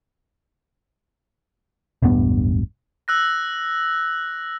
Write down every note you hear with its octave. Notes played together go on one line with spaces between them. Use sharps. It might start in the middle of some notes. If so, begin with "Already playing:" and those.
E1 A1 G2 B3
E6 F#6 A#6